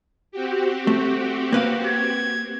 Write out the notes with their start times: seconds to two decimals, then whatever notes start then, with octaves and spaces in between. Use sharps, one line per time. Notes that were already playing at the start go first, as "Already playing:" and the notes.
0.31 C4 F#4 G4
0.87 A3
1.52 A#3 B4 F5
1.87 G#6